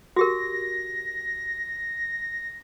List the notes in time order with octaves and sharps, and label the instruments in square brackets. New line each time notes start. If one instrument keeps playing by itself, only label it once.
[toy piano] F#4 G4 A#4 [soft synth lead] A#6